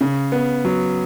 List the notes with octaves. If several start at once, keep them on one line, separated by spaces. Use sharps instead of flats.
C#3
B3
F#3